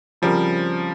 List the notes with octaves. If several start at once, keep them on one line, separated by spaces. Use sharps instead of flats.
C#3 F3 G3 C4 G4 A#4